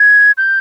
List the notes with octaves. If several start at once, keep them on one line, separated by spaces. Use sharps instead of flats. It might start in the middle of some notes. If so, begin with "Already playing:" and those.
Already playing: G#6
G6